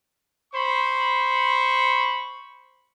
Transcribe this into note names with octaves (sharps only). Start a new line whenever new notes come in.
C5 B5 C#6